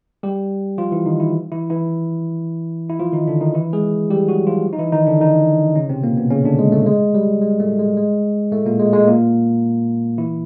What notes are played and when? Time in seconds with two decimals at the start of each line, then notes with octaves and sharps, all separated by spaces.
0.23 G3 G4
0.78 F3 F4
0.92 E3 E4
1.06 D#3 D#4
1.20 E3 E4
1.52 E3 E4
1.70 E3 E4
2.89 E4
2.99 F3 F4
3.13 D#3 D#4
3.27 D3 D4
3.41 D#3 D#4
3.54 E3 E4
3.73 G#3 G#4
4.10 G3 G4
4.28 F#3 F#4
4.47 F3 F4
4.73 D#4
4.79 E3 E4
4.92 D#3 D#4
5.07 D3 D4
5.20 D#3 D#4
5.75 C#3 C#4
5.89 C3 C4
6.03 A#2 A#3
6.17 B2 B3
6.30 C#3 C#4
6.45 D3 D4
6.59 G#3
6.72 A2 A3
6.86 G#3
7.15 G3
7.42 G#3
7.59 A2 A3
7.79 G#3
7.97 G#3
8.52 A2 A3
8.66 A#2 A#3
8.80 G#3
8.93 G#3
9.07 A#2 A#3
10.18 E3 E4